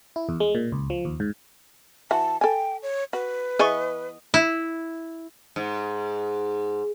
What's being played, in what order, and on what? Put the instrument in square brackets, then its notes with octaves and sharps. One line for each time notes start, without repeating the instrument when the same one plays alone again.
[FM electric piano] E4
E2
G#3
A#2
C#2
F3
D#2
G#2
[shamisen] E3 F#4 [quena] A5
[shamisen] A4 G#5 [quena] G5
[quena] C#5
[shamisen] F#4 [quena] B4
[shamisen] E3 G#4 [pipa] B3 D#5 C#6
[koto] E4
[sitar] G#2